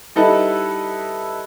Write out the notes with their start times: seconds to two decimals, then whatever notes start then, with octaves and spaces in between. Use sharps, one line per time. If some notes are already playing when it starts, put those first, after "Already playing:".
0.15 G3 D#4 E4 A4 B4